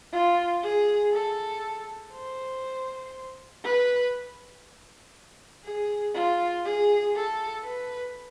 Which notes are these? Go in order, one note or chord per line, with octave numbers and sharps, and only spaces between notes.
F4
G#4
A4
C5
B4
G#4
F4
G#4
A4
B4